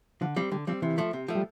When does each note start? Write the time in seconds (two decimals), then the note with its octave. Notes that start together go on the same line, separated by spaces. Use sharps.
0.21 D3 F3
0.36 F3 G3 C4
0.52 D3 G3
0.67 F3 G3 C4
0.82 C3 E3
0.98 F3 A3
1.13 C3
1.28 F3 A3
1.35 G3